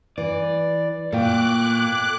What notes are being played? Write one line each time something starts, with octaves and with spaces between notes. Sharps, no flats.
E3 D5
A#2 A4 G5 D6 F#6